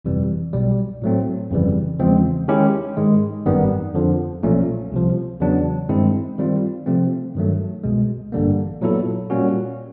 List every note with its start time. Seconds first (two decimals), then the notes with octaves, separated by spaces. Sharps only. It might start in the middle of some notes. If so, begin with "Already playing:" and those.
0.05 G1 F2 C3 E3 G3
0.53 B1 B2 G3
1.02 A2 F#3 A3 C4
1.51 G1 F2 C#3 E3 G3
1.99 E2 C#3 F3 G#3 C4
2.48 D#3 G#3 C#4 E4 G4
2.97 G#2 D#3 G#3
3.46 G#1 F#2 D#3 G3 B3
3.94 F2 D3 F3
4.43 B1 A#2 F3 A3 C#4
4.92 C2 C3 F3
5.40 E2 C#3 F#3 B3 D4
5.89 G2 D#3 G#3 C4 E4
6.38 D#3 G3 C4 F4
6.86 C3 F3 A3 C4
7.35 G2 D#3 F#3 A3
7.84 C2 B2 G#3
8.32 A1 G2 D3 G3 A#3
8.81 A#2 F#3 B3 E4 A4
9.30 A#2 G3 A#3 C#4 F#4